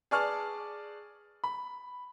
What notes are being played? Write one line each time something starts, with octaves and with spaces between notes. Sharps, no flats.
G#4 B4 D5 A5 C#6 F6
B5